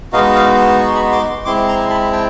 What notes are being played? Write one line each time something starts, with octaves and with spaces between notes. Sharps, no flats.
G#3 B3 D#4 F#4 D#5 F5
D#5 F5
C#6
C6
B5 C#6
C6 D6
G#3 C4 E4 C6 D6
A#5 C6
A5 B5
G5 A5